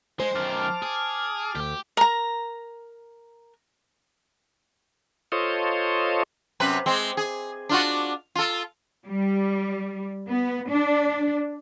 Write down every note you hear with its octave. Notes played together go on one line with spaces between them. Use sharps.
G#3 C5
F#2 D#3 A5 D6 F6
G#4
D2 G4
A#4 A#5
F4 A4 C5 C#5 D#5
F#2 C3 B4
G#3 C4
G#4
D4 F4 F#4
F4 A4
G3
B3
D4